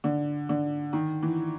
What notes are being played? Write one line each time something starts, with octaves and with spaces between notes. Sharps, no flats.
D3
D3
D#3
E3